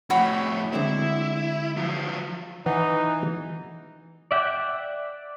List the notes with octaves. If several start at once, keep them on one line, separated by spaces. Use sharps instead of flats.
F2 A2 F#4 C#5 B5
D3 G#3 C4 E4
F3 F#3
E3 D#4 B4 F#5
D5 E5 F#5 G5